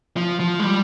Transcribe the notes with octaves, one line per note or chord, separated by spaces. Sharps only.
F3
F3
G#3
G3